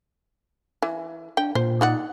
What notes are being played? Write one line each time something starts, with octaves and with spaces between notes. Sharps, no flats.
E3
D4 G5
A#2 C5
D#4 D5 F#5